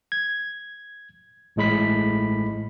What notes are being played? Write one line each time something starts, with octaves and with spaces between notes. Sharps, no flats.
G#6
A1 A2 G#3 B5 B6